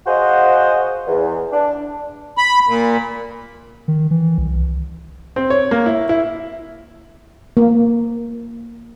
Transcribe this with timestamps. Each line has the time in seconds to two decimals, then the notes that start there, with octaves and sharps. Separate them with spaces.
0.06 F#4 G#4 C5 D#5 F5 F#5
1.07 E2
1.51 D4
2.38 B5
2.67 A#2
3.88 D#3
4.11 E3
4.38 C2
5.36 C4
5.50 C#5
5.71 A#3
5.86 E4
6.09 E4
7.57 A#3